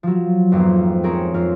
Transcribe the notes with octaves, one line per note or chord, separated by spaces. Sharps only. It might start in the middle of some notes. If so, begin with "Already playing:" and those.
F3 F#3
G#1 F2 A#3 B3
C4 G#4 A#4 C#5
F2 F5